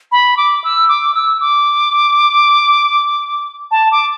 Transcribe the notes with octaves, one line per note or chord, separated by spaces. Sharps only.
B5
D6
E6
D6
E6
D6
A5
D6